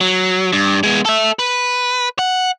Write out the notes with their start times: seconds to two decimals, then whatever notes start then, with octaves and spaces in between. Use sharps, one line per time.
0.01 F#3
0.53 G2
0.83 G#3 B3
1.05 A4 E5
1.39 B4
2.19 F#5